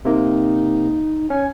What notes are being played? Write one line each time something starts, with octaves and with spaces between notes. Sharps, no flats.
C3 A#3 D#4
C#4 G#5